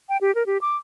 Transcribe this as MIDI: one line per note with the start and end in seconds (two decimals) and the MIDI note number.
0.09 0.17 79
0.21 0.34 67
0.35 0.46 70
0.46 0.58 67
0.61 0.76 86